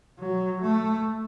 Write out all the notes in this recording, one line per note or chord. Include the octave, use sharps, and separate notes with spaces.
F#3
A3